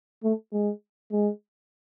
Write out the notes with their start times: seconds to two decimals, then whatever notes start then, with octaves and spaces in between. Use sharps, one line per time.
0.24 A3
0.53 G#3
1.12 G#3